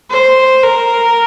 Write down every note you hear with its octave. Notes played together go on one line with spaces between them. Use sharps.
C5
A#4